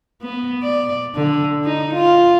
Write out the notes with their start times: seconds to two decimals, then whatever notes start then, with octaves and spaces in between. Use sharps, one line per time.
0.22 B3
0.62 D5
1.15 D3
1.64 D#4
1.95 F4